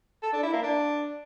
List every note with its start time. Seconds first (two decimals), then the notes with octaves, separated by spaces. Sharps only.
0.23 A4
0.33 D4
0.43 E4
0.53 A#3
0.63 D4